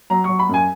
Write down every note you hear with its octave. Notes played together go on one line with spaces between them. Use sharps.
F#3 A#5
F#3 C#6
B5
F#2 G#5